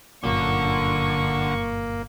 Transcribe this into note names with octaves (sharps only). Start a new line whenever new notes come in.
G1 F#2 A#2 D3 A#3 C#6